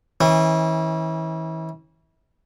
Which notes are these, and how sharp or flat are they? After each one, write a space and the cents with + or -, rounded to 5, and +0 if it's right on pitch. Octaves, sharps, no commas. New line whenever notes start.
E3 -35 C#4 -35